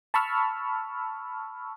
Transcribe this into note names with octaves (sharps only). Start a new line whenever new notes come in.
A5 B5 C#6 E6 F6